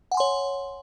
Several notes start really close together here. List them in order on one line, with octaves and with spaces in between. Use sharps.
F#5 G#5 C6 C#5